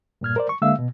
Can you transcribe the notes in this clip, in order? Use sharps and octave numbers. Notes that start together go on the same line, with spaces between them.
G2 A#2 F6 G#6
A#4 C5 D5
C#6
D3 G#3 A#3 E5 F5 E6
B2